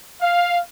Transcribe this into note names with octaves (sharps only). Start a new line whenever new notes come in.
F5